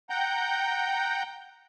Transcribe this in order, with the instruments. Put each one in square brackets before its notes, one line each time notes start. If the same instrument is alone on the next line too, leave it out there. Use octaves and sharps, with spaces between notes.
[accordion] F#5 G5 A#5 G6